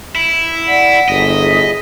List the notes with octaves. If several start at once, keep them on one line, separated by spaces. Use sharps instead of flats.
E4
D5 F#5 B6
G1 E4 G#4 D#5